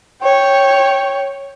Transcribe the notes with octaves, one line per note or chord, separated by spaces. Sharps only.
C#5 G5